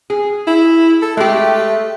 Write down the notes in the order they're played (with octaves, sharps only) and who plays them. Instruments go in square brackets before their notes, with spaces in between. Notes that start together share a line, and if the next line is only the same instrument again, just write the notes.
[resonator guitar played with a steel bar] G#4
[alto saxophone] E4
A4
[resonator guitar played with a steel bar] G#3 G4 [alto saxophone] A3